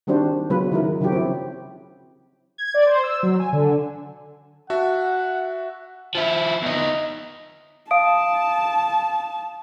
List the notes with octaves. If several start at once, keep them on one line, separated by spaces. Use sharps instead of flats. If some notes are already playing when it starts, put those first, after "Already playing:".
D#3 G3 C4 D4 F#4 C5
C#3 F#3 G#3 B3 F4 B4
D#3 F#3 G#3 E4 F#4 A#4
C#3 F3 F#3 F#4 G4
C4 E4
G#6
D5
C5
E6
F#3
G#5
D3
F#4 E5 F#5 A5
F3 E4
E2 D#4
F5 A5 D#6 D7